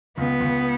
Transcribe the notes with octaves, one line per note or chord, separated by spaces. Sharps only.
C#2 B3
C#2